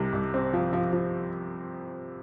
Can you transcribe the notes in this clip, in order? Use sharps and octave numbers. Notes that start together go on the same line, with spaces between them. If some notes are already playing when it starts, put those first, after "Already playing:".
Already playing: C2 C3
C2
C4
F3
F3
F3